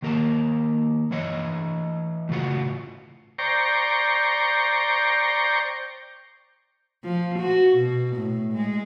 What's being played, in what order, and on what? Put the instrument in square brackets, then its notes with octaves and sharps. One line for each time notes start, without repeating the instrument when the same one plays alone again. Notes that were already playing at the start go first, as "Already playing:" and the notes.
[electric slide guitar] D#3 A#3 A#4 F#5 A5
E3 C#5 D#5
A2 C#3 F4 F#4
[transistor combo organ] C5 D5 G5 A#5 C#6
[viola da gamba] F3
F#4
B2
A2
G#3